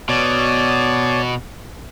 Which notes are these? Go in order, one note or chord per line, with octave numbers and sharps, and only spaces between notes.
B2 C#5 D5